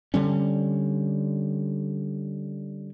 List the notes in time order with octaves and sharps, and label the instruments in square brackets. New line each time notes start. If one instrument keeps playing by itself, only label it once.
[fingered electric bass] D3 G3 C#4